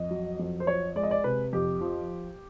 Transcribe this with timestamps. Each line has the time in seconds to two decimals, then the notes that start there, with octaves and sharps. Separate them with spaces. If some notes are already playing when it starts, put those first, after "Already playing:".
Already playing: F2 D#5
0.11 F#3
0.39 F2
0.60 C5
0.67 F3 C#5
0.96 G#3 D5
1.03 D#5
1.11 D5
1.24 C3 B4
1.53 F2 G4
1.81 F3